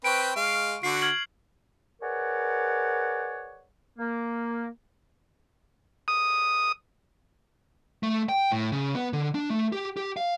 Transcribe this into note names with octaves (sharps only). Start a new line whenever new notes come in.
C4 B4 G5 C#6 D7
G#3 F5
D3 F#4 C7
F6 G#6 F#7
G#4 A#4 B4 C#5 D5 F#5
A#3
D#6
A3
G5
A2
C#3
B3
D3
D4
A3
G4
G4
F5